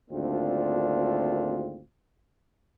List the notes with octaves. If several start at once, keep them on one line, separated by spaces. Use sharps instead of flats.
G#1 D2 A#3 C4 D4 F4